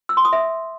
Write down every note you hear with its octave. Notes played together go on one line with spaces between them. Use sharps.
E6
C6
D#6
E5